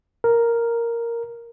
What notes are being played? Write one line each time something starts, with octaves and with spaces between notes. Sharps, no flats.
A#4